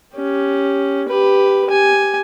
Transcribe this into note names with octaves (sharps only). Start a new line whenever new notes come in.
C#4 G4
G4 B4
G4 G#5